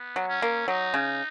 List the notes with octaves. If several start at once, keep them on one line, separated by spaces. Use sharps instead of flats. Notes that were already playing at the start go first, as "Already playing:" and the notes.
Already playing: B3
F#3
C#4
A#3
F#3 D#4
C#3